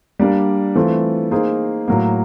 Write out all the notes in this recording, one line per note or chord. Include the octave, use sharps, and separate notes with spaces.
G3 A#3 D4
E3 A3 C4 F4
A#3 D#4 G#4 C5
A2 F#3 A#3